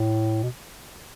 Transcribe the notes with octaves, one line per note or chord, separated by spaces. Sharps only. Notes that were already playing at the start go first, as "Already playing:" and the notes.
Already playing: A2
B2